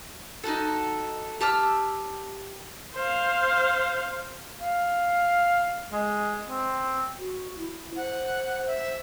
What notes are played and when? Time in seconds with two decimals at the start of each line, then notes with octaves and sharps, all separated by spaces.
0.44 D#4 E4 F#4 A4
1.40 G4 A5 E6 F6
2.96 C5 F5
4.61 F5
5.92 G#3
6.47 C4
7.18 F#4
7.57 E4
7.96 C5 F#5
8.67 E5